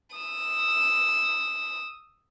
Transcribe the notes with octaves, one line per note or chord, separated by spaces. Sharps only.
D#6 E6